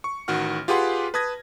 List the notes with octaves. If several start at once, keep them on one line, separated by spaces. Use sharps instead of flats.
C#6
A1 D#3 F#4 F#5 F6
F4 G4 G#4 B4 F#5 C6
B4 A5 D#6 G#6 A#6